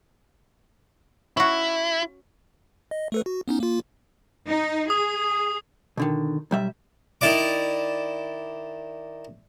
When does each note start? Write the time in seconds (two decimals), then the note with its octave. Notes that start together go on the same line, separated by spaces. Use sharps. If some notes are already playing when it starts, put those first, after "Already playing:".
1.37 C#4 E4 F#4
2.91 D#5
3.12 A3 A4 B4
3.26 F#4
3.48 B3 C#4 D#4
3.60 A#3 F4
4.47 D#4
4.90 G#4 D#6
5.97 B2 D3 D#3
6.51 B1 G3 E5
7.21 D#3 E4 D5 D6